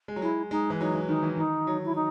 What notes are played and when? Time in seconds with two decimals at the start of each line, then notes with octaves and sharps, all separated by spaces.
0.08 G#3
0.16 F#3
0.22 G#3 E4
0.51 G#3 D#4
0.70 E3
0.80 F#3 D#4
0.95 E3
1.08 D#3 D#4
1.23 E3
1.37 D#3 D#4
1.67 F#3
1.85 E4
1.95 D#4